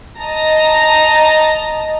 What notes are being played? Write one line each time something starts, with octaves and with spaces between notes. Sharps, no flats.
D#5 A5 A#5